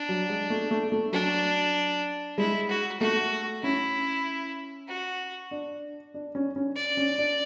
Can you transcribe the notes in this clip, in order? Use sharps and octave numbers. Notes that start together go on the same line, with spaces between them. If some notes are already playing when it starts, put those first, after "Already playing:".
Already playing: D4
F#3
G#3
A3
A3
A3
F#3 D4
G#3 E4
F#4
A3 F#4
C#4 E4
F#4
D4
D4
C#4
C#4
D5
C#4
D4